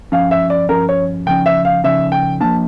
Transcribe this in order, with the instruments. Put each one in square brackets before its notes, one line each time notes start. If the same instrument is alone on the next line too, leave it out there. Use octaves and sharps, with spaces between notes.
[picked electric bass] G2 F3 C#4 [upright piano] F5
[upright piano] E5
D5
[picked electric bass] G2 F3 C#4 [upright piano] A#4
[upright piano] C#5
[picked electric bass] C#3 F3 C#4 [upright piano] G5
[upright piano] E5
F5
[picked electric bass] C#3 F3 C#4 [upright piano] E5
[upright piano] G5
[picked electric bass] F3 A#3 D4 [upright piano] A5